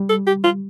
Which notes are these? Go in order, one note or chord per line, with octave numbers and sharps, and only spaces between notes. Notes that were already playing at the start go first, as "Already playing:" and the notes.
Already playing: G3
A4
G4
F4